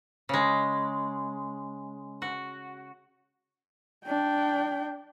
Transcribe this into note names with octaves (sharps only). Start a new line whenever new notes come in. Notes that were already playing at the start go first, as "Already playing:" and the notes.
C#3 G#3
F#4
D4 G5